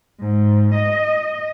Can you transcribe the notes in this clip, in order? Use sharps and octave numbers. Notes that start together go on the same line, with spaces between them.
G#2
D#5